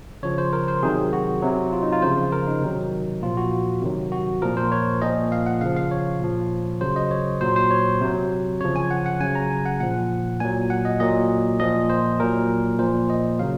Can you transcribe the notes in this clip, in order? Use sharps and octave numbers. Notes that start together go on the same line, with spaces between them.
C#3 F3 C#5
C5
A#4
C5
C3 D#3 F#3 G#4
F#4
C3 F#3
F4
D#4
F4
C#3 F3 C5
A#4
D#4
C3 D#3 F#3
A#2 F3 F4
F#4
C3 D#3 F#3
F#4
A#2 F3 A#4
C5
C#5
A#2 F3 D#5
F5
F#5
C#3 F3 F5
F5
C#5
A#2 F3
C#3 F#3 C5
D#5
C#5
A#2 F#3 C5
C5
C#5
C3 F#3
C#3 F3 C#5
G#5
F#5
F#5
C#3 F#3 G#5
A#5
G#5
F#5
A#2 F3 F#5
A#2 F#3 G#5
F#5
D#5
A#2 F#3 D#5
A#2 F3 D#5
C5
A#2 F#3 A#4
A#2 F3 C5
D#5
C#3 F#3 F5